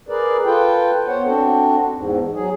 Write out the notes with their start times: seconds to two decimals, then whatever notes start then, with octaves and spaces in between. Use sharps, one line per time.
0.08 G#4 A#4 B4 D5
0.45 F4 A4 B4 G5
1.07 B3 C5 C#5 F#5
1.25 C4 D4 F#4 A4
1.92 E2 G#2
2.34 F#3 G#4